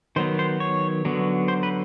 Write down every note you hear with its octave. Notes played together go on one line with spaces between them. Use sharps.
D#3 F#3 B3 C5
C5
C#5
D3 F#3 B3
C5
B4